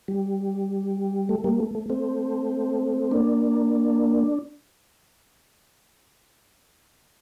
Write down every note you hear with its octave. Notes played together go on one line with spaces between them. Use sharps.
G3
A3
G3 A#3
A3
A3
A3 C4
A#3 D4